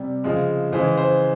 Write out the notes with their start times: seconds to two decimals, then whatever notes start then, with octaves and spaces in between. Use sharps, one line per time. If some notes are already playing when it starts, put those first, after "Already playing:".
Already playing: C3 G3
0.24 C#3 F3 G#3
0.72 C#3 E3 G#3 C5
0.97 C5